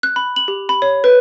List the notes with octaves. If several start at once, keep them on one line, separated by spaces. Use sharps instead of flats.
F#6
B5
F#7
G4
B5
C#5
B4